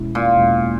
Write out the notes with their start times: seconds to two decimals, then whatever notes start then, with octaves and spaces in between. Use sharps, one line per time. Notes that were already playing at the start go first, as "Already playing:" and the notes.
Already playing: E2 B2 G#3 C#4 E4
0.15 A#2
0.38 E2 B2 G#3 C#4 E4